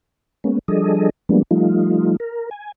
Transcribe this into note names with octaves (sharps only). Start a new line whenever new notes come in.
G#3 A#3 B3 C#4
F3 G3 D4 G#4 A4 D#5
F3 G3 G#3 A#3 B3 D4
F3 G3 A3 D#4 F4
A#4
G#5